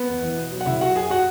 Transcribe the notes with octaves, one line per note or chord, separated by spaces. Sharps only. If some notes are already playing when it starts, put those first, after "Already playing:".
Already playing: B3 B4
E2
E3
B2
F#3
F#5
C#3 E4 E5
F#3 F#4 F#5
F#2 G#4 G#5
F#4 F#5